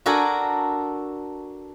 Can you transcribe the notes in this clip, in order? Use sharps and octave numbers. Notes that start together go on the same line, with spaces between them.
D4 F#4 A4 A#4 G#5